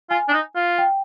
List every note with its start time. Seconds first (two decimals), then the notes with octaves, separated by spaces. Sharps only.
0.10 F4 G#5
0.29 D4
0.33 D#4
0.55 F4
0.78 G5